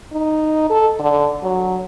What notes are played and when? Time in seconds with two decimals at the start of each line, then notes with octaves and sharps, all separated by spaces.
0.12 D#4
0.70 A4
0.99 D3
1.43 F#3